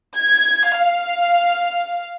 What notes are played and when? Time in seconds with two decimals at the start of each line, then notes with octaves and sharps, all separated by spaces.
0.16 G#6
0.76 F5